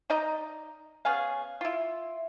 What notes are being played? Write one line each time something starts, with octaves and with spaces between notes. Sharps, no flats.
D#4 D5 D#5 A#5
B3 C#4 G#4 F5
E4 F4